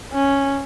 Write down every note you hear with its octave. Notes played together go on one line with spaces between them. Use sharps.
C#4